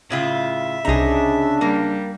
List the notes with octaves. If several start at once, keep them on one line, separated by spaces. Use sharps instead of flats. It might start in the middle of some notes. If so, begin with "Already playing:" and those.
A2 C#3 F4 E5
C2 C#3 D4 D#4 G#4 A#5
G3 A#3